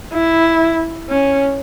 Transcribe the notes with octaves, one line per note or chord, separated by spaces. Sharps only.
E4
C#4